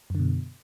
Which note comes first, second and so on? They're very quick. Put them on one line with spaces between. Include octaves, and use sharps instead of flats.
F#2 D3 B2